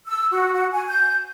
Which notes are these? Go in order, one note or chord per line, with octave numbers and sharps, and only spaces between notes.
E6
F#4
F#4
G#5
G6